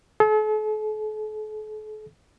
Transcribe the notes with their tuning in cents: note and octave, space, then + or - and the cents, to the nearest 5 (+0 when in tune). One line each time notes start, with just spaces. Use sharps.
A4 -45